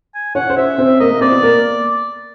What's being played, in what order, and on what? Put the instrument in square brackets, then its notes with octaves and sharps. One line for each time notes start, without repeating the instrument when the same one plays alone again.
[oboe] G#5
[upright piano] C#4 C#5 [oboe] F#5
[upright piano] C5
[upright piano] C#4 C#5 [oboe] E5
[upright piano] C4 C5
[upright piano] A#3 A#4 [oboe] D#5
[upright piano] A#3 A#4
[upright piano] C4 C5 [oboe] D5
[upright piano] B3 B4
A#3 A#4